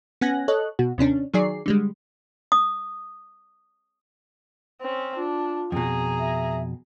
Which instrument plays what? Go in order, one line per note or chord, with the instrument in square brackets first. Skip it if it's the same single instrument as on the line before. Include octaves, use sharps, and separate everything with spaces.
[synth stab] B3 C#4 F#5 G#5 F#6 A#6
A4 C#5 D#5 F#6
B2 F#4
D#2 C3 C#4 D4
D#3 F#3 G#4 D5 C7
D3 G3 G#3
[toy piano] D#6
[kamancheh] C4 C#4
[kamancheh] D4 [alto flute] F4
[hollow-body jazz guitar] F2 B2 [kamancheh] G#4 A#5
[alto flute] E5